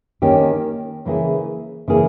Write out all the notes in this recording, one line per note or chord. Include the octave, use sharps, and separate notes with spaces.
D#3 A#3 C#4 G4
C#3 E3 A#3 E4 G#4
C#3 E3 A#3 E4 G#4